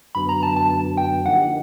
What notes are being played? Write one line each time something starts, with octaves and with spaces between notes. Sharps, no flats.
F#2 D3 F#3 B3 B5
A#5
A5
A5
A5
G5
D3 F3 A#3 D#4 G4 F#5